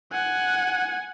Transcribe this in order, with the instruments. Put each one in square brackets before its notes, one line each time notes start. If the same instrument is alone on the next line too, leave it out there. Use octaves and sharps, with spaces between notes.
[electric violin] F#5 G#5